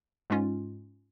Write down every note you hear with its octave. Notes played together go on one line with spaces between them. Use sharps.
G#2 G#3 C#4 F4